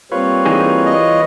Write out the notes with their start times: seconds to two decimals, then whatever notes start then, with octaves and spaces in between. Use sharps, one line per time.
0.12 G3 A#3 C4 F4 B4 C#5
0.46 E3 D#4 G#4
0.86 D#5